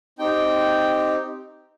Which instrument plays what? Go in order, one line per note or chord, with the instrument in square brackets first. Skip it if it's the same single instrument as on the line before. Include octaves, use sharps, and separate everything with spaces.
[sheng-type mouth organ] C4 D#4 G4 G5